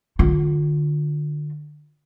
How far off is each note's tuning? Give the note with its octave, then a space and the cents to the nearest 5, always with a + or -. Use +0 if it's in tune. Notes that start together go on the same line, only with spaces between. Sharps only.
D3 +30 F4 +25